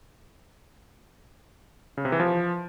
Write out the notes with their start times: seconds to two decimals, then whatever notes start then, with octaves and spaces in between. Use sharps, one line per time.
1.97 C#3
2.05 C3
2.12 E3
2.20 F3